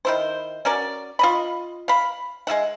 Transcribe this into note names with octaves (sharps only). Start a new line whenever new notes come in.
D#3 E4 C5
C#4 F#4 A#4 D5
F4 D#5 B5
F5 B5
G#3 F4 E5 F#5